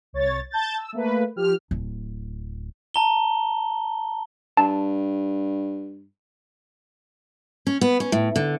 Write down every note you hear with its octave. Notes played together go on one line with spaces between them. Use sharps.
C2 C#5 A6
A5 G6 A6
E6
A3 A#3 B4
F3 G4 F6
D1
A5 A#5 G7
G2 A5
C#4
B3
C#4
A2
D3